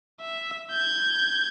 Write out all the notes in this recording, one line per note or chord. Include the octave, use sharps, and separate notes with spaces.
E5
G6 G#6